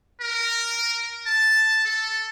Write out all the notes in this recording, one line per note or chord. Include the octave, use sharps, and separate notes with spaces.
A#4
A5
A4